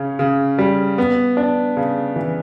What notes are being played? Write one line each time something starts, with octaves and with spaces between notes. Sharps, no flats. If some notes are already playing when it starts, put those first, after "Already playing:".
Already playing: C#3 C#4
C#3
G3
B3
D4
C#3
E3